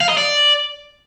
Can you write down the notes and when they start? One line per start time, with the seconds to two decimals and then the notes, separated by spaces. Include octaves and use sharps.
0.01 F5
0.09 D#5
0.17 D5